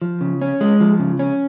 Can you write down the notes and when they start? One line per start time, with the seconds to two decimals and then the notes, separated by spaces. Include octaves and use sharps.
0.02 F3
0.21 C#3
0.42 C#4
0.61 G#3
0.80 F3
0.99 C#3
1.19 C#4